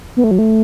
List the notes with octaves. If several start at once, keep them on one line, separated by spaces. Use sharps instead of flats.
B3
A3
F#3
A3